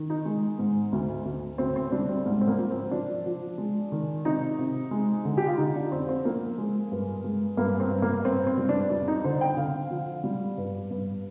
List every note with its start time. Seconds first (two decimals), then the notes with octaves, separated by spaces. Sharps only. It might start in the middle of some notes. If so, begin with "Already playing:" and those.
Already playing: D#3
0.10 D#4
0.25 G#3
0.59 G#2
0.92 D2
1.25 D2
1.58 D2 C4
1.76 C4
1.92 G3 D4
2.09 C4
2.26 G#2
2.41 C4
2.47 A#3
2.58 F3
2.70 C4
2.91 F3 D4
3.26 F3
3.58 G#3
3.92 D#3
4.25 C3 D#4
4.59 C3
4.91 G#3
5.25 D3
5.37 G4
5.48 F4
5.58 D3 D#4
5.75 D4
5.91 F2 C4
6.09 C4
6.25 F3 A#3
6.58 G#3
6.92 G2
7.24 G#3
7.57 G2 A#3
7.80 C4
7.91 G2
8.02 A#3
8.25 G2 C4
8.47 C4
8.58 G3
8.69 D4
8.90 F2 D4
9.08 D#4
9.24 D3 C5
9.41 G5
9.57 D3 F5
9.91 F3
10.24 G3
10.57 G2
10.91 G2